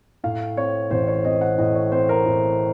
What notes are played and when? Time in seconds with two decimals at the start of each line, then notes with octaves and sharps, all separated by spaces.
0.24 A2 F5
0.57 C4 C#5
0.91 A1 C5
1.08 C#5
1.25 C4 D#5
1.41 F#5
1.58 A2 D#5
1.75 C#5
1.92 C4 C5
2.09 A#4
2.26 A2